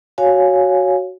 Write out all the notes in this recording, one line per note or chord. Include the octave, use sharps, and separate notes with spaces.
F#4 C#5 F5 G#5